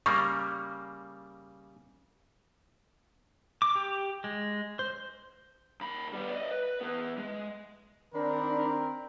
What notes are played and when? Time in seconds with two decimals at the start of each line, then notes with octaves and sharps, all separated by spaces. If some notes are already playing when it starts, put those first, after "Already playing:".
0.06 C#3 G3 A#3 C#6
3.62 D6
3.75 G4
4.24 G#3
4.79 C5
5.81 D#2 B5
6.13 G3 B3
6.30 D5 D#5
6.51 B4
6.81 E3 B3
7.18 G#3
8.14 D#3 C4 D4 A#4 B5